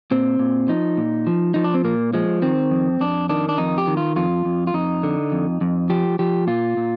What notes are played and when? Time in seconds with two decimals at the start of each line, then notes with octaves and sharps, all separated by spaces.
0.11 A#2 C4
0.39 A#2
0.68 F3 D#4
0.97 A#2
1.27 F3
1.54 F3 D#4
1.64 D4
1.74 C4
1.84 A#2 A#3
2.13 F3 G#3
2.42 D#3 C4
2.71 F2
3.01 F2 D4
3.29 D#3 D4
3.49 D4
3.58 F2 D#4
3.78 G4
3.87 D#3
3.97 F4
4.16 F2 F4
4.45 F2
4.67 F4
4.74 F2 D#4
5.03 D3
5.32 F2
5.61 F2
5.90 F3 G4
6.19 F3 G4
6.47 A#2 F4
6.77 A#2